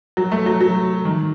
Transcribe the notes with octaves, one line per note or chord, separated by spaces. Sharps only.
F#3
A3
F#3
F#3
D#3